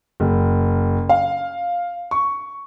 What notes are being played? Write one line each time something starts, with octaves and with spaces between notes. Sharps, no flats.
F#1
F5
C#6